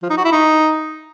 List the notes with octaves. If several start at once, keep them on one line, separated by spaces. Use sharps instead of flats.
F3
D#4
F#4
E4
D#4